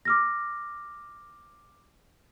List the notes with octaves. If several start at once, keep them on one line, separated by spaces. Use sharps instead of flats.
D6 F6 A#6